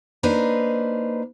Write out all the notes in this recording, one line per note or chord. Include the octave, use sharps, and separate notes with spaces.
A#3 D4 D#4 B4 C5